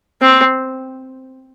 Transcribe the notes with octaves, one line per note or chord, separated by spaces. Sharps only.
C4